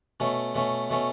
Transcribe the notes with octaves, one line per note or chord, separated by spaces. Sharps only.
B2 A3 C#4
B2 A3 C#4
B2 A3 C#4